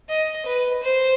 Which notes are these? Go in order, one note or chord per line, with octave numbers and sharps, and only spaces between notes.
D#5
B4
C5